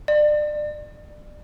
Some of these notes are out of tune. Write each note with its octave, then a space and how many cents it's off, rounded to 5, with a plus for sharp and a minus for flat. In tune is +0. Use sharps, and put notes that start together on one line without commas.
D5 +30